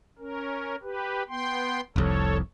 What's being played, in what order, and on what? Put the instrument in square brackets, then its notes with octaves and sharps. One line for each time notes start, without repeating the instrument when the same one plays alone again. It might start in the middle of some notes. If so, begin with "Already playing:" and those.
[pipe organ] C#4 A#4
G4 B4
B3 G5 C6
[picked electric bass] F1 C2 F2 [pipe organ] A4 C#5